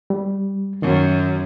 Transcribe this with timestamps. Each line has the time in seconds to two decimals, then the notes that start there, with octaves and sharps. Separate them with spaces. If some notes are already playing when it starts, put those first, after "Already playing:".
0.10 G3
0.82 F#2 D#3